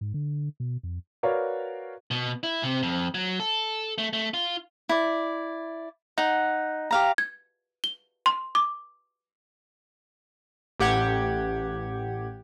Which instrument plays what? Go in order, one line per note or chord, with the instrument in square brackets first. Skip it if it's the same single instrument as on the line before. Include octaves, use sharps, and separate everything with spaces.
[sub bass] G#2
D3
B2
F2
[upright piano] F#4 A#4 B4 C#5 D5 F5
[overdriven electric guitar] B2
E4
C3
F2
F#3
A4
A3
A3
F4
[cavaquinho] E4 D5
D#4 F#5
G4 F5 A#5
[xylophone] G#6
G7
C6
D6
[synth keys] A1 G4 F#5 G#6